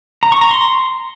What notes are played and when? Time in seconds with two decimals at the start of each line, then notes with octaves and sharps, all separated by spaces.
0.23 A#5
0.32 C#6
0.41 A#5
0.51 C6